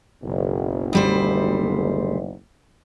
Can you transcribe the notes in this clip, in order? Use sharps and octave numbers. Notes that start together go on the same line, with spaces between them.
F#1 B1
D2 G3 C5